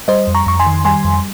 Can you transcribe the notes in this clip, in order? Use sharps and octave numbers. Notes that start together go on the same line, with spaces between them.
G3 C5 D#5
F2
A#5 C#6
F2 C#6
G#5 C6
D#3
G3 G#5 C6
F2